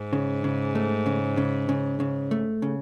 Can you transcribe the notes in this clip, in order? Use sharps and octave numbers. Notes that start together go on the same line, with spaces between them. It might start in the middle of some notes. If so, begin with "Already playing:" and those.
Already playing: G#2
C#3
C#3
A3
C#3
C#3
C#3
C#3
A3
C#3